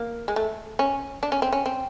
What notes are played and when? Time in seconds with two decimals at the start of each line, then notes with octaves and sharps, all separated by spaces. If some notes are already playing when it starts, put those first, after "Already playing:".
Already playing: A#3
0.28 G#3
0.36 A3
0.79 C#4
1.23 D4
1.32 C#4
1.42 C4
1.52 C#4
1.66 C4